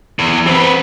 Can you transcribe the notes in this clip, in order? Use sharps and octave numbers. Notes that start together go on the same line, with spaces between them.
E2
C4 B4